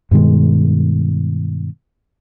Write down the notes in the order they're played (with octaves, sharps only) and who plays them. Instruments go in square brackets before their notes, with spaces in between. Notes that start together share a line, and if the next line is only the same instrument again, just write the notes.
[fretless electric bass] G2 B2 D#3 G#3